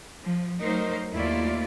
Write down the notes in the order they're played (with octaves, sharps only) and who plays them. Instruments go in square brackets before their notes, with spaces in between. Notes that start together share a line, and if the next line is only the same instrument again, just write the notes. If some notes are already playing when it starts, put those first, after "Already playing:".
[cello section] F3
F#3 A3 D#4 A#4 C5
D#2 A3 E4 F4 D5